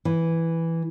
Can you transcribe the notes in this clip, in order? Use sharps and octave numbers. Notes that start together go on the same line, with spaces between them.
E3